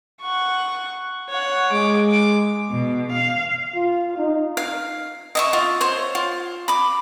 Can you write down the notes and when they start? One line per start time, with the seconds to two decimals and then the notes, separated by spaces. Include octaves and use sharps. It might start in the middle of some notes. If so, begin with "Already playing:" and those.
0.21 F#5 C#6
1.30 C#5 F#5
1.72 G#3 D6
2.11 D6
2.70 B2
3.10 F5
3.75 F4
4.18 D#4
4.57 F5
5.35 D#5 E5 C#6
5.53 F4
5.81 C5 C#5
6.15 F4
6.68 B5 D6